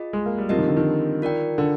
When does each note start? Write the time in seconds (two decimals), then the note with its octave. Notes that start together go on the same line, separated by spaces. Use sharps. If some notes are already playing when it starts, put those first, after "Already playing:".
Already playing: F4 G#4 D#5
0.13 G#3
0.26 A#3
0.38 G3
0.49 F3 C4 G4 A#4 D#5
0.59 D#3
0.68 D3
0.77 D#3
1.22 F4 A#4 D5 G5
1.58 D3